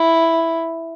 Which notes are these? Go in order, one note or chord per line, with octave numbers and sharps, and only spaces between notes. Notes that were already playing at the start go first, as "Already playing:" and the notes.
Already playing: E4